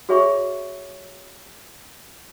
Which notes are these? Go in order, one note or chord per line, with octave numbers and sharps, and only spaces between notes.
F#4 G#4 C#5 E5 B5 C#6